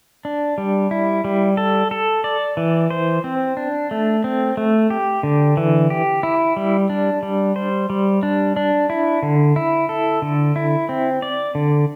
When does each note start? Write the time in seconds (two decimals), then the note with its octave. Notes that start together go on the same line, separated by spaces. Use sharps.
0.25 D4
0.58 G3
0.91 E4
1.25 G3
1.57 A4
1.91 A4
2.24 D5
2.57 E3
2.90 C5
3.24 C4
3.57 D4
3.91 A3
4.24 C4
4.57 A3
4.90 G4
5.23 D3
5.57 E3
5.90 G4
6.23 E4
6.56 G3
6.90 D4
7.23 G3
7.56 C5
7.90 G3
8.23 D4
8.57 D4
8.90 E4
9.23 D3
9.56 E4
9.89 A4
10.22 D3
10.56 E4
10.89 C4
11.22 D5
11.55 D3